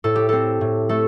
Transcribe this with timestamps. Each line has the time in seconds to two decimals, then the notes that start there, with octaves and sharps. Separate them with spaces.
0.04 A2 A4
0.16 G4
0.29 C4 A4
0.61 A2
0.89 A3 A4